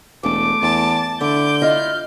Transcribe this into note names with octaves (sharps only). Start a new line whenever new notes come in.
E1 A3 D6
E2 A5
D3 E4 D6 G6
E4 F4 D#5 F6